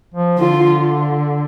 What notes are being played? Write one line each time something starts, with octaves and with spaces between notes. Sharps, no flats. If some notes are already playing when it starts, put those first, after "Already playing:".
F3
D3 F4